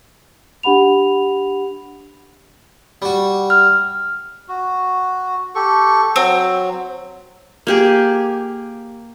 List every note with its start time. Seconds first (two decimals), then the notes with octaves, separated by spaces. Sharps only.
0.63 D4 G4 F#5 B5 F7
3.02 G3 F#4
3.50 F6
4.48 F#4
5.55 G4 A4 C#6
6.16 F#3 C4
7.67 A#3 G4 G#4